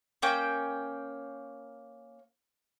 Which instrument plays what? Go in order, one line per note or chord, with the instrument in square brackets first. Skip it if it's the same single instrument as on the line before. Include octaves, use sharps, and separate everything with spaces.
[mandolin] A#3 C#4 G5